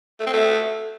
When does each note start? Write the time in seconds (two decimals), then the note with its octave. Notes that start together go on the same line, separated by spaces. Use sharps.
0.20 A3
0.26 C4
0.33 A3